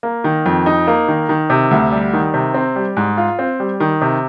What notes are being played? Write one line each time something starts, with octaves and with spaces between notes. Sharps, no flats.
A#3
D#3
F2
D#4
A#3
D#3
D#3
C3
D2
G3
D#3
C3
C4
G3
G#2
F4
C4
G3
D#3
C3